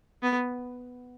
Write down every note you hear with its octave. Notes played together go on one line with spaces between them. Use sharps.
B3